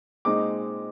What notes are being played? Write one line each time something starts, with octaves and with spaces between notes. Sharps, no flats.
A#2 G#3 C4 D#4 D6